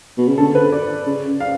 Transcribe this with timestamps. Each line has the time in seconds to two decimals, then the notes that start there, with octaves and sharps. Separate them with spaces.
0.18 B2
0.27 C#3
0.38 D3 A4
0.55 B4
0.72 D5
1.06 C#3
1.40 F5